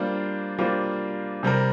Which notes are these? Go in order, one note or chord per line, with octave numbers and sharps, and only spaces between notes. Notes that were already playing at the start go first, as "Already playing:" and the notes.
Already playing: G3 A#3 D4 F4 C5
G3 A#3 D4 F4 C5
C3 G3 C4 A#4